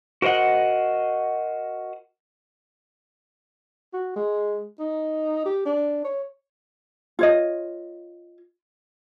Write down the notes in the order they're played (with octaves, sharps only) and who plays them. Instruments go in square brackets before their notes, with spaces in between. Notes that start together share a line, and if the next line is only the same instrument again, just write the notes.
[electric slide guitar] F#4 A#4 C5 D#5 F#5
[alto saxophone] F#4
G#3
D#4
G4
D4
C#5
[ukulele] F4 C#5 D#5